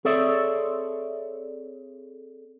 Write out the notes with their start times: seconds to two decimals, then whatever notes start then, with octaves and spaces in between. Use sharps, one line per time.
0.05 C4 G#4 A4 C#5 D5 E5